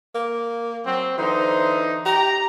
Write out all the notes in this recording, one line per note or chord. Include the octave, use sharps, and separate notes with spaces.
A#3
F#3 C4
D3 E3 D#4 C5
G4 A#5